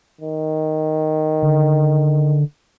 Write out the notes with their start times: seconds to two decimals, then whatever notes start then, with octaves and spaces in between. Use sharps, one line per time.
0.21 D#3
1.43 D3